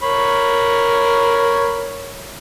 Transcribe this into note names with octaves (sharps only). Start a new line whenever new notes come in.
A#4 C#5 B5